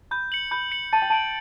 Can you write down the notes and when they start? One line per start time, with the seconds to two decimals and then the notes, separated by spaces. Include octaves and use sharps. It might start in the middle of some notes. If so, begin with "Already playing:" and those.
0.11 B5 G6
0.32 C#7 F#7
0.51 B5 G6
0.72 C#7 F#7
0.93 A5 A6
1.02 G5
1.10 A5 D7 F#7